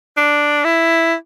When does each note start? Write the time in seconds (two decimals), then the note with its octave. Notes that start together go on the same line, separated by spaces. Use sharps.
0.17 D4
0.64 E4